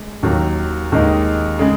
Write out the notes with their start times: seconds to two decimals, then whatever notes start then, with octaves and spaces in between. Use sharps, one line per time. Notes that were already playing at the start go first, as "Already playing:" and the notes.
Already playing: G#3
0.23 D#2 D#3 F#3
0.92 D#2 D#3 G#3 D#4
1.59 C#3 G#3